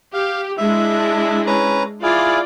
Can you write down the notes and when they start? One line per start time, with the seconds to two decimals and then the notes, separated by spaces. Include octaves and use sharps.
0.14 G4 F5
0.58 G#3 D4 E4 E5
1.47 C#4 B4 A#5
2.03 E4 F4 G#4 D5 F5